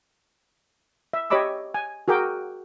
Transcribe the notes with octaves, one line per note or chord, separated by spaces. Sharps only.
E5
G4 C#5 D#5 B5 D6 E6
G#5
F#4 G#4 A#4 G5 D6